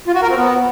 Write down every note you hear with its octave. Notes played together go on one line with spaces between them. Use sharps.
F4
F#4
A#4
C4
B3